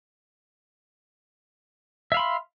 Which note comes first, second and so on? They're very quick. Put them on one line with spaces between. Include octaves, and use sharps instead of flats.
E5 F5 B5 C6